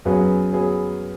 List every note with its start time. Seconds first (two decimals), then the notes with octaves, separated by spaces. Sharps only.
0.05 F#2 F#3 B3 G#4 B4
0.53 F#3 B3 G#4 B4